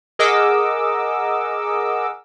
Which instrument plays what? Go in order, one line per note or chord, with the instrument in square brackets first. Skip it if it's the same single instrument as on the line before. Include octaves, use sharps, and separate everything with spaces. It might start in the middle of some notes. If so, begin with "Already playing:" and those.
[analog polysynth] G#4 A#4 D#5 F#5 D6 E6